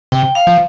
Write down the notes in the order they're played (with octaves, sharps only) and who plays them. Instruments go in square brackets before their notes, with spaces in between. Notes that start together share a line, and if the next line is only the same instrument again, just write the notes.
[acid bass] C3 [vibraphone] G5
[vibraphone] F5
[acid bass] F3